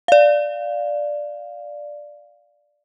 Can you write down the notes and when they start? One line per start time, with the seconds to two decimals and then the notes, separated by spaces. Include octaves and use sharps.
0.08 D5 F5